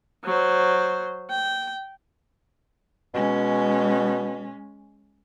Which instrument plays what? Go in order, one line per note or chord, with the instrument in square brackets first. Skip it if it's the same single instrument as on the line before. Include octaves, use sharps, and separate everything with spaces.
[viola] F#3 C5
G5
[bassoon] B2 [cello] G#3 C#4